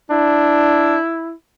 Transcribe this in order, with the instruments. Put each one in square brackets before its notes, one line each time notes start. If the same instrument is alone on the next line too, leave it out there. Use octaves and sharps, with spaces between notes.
[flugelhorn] D4 [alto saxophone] E4